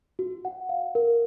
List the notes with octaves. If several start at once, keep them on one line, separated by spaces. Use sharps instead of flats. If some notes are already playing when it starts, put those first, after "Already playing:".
F#4
F#5
F5
A#4